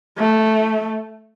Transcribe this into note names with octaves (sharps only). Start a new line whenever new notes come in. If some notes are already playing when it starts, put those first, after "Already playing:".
A3